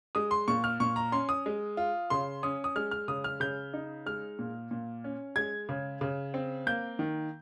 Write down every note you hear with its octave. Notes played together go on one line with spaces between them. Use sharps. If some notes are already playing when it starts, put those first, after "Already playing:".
G#3 D#6
C6
A#2 C#6
F6
A#2 C#6
A#5
C#4 C6
D#6
G#3
F4
C#3 C6
C#4 D#6
D#6
G#3 F6
F6
C#3 D#6
F6
C#3 G6
D#4
G#3 F6
A#2
A#2
C#4
G#3 G#6
C#3
C#3
C4
A#3 G6
D#3